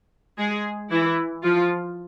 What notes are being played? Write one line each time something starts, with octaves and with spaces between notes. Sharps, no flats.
G#3 G#4
E3 E4
F3 F4